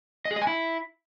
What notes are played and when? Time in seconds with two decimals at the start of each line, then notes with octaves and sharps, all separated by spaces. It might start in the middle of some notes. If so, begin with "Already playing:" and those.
0.25 D#5
0.31 G#4
0.36 D#5
0.42 G#5
0.47 E4